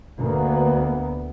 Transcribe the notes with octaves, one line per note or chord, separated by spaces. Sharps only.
D2 A#3 B3